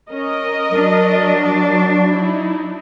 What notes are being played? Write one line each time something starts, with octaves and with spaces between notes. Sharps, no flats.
C#4 A#4 D#5
F#3 D4 D5
D#4 E4